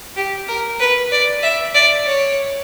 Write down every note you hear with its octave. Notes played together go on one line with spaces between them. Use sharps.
G4
A#4
B4
D5
E5
D5
C#5